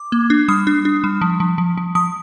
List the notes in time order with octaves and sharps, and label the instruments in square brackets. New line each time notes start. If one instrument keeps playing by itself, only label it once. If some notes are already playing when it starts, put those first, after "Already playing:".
Already playing: [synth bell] D6
A#3
D4
G3 D#6
D4
D4
G3
F3
F3
F3
F3
F3 D#6